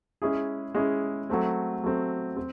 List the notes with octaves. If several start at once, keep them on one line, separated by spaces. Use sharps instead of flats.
G#3 C#4 E4 G#4
G#3 C#4 E4 G#4
F#3 A3 C4
F#3 A3 C4
C4